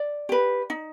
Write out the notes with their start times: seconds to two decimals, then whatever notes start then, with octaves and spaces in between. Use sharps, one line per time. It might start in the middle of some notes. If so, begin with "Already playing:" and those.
Already playing: D5
0.29 G4 B4
0.70 D#4